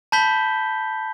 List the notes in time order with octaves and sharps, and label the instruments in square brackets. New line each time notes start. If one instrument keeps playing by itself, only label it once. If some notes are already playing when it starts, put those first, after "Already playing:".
[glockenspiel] A5 B5 G6 B6 G7